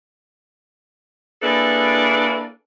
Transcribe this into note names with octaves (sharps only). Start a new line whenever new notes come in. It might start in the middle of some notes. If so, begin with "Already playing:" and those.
A#3 D4 E4 G#4 A4 B4